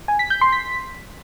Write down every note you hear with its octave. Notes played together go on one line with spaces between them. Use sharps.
G#5
B6
G6
C6
B6